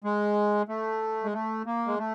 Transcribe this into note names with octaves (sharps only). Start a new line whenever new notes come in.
G#3
A3
G#3
A3
A#3
G#3
A3